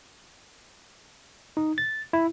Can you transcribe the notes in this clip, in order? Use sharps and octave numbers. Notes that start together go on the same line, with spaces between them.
D#4
A6
E4